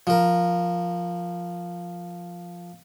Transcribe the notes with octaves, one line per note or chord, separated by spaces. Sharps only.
F3 A#4